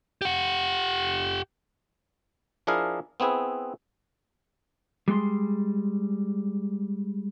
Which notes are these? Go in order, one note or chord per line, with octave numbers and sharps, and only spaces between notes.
G4 F#5
F3 D4 E4 G#4 A#4 F5
B3 C4 E4 G#4 B4
G3 G#3 G#4 C6